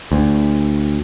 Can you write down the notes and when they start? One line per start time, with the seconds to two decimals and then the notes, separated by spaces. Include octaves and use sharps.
0.12 D2